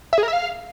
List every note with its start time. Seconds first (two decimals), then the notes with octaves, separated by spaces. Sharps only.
0.13 E5
0.18 G#4
0.23 A#4
0.28 E5
0.33 F5